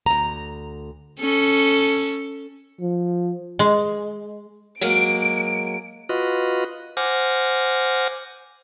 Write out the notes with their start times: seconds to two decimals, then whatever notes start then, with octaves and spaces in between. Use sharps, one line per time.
0.06 D2 A#5
1.20 C#4 A4
2.80 F3
3.59 G#3
4.81 F#3 G#3 A#3 D7
6.09 F4 F#4 B4 D#5
6.97 C5 F#5 G#5 D6 F6 A#6